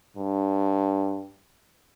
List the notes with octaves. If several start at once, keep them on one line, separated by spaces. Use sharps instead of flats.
G2